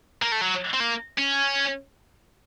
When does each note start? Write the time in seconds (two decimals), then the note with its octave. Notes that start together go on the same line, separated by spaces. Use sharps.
0.22 A#3
0.32 A3
0.41 F#3
0.74 C4
0.80 A#3
1.18 C#4